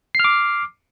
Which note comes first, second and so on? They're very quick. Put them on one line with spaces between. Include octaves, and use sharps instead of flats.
C7 F6 D6